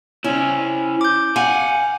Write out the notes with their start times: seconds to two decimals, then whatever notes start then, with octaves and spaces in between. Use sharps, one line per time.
0.24 C#4 E4 C5
1.01 D6 G6
1.36 F5 F#5 G#5